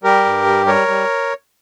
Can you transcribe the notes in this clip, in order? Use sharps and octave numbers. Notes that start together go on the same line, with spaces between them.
G3 G4 A#4
G2
G3
G3 A#4 C#5
G3